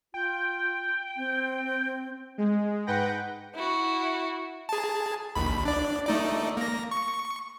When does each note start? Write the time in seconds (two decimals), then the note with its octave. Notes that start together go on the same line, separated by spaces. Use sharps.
0.14 F4 G5
1.16 C4
2.38 G#3
2.87 G#2 B4 F#5 G5 G6 A#6
3.54 E4 F#4
4.69 G#4 A5
5.35 A#1 D#2 B5
5.65 D4 D5
6.07 A3 D#4 D5
6.57 A#3 A#6
6.91 C#6